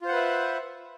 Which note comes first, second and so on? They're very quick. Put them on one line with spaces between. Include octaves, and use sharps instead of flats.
F4 C5 F#5 B4 E5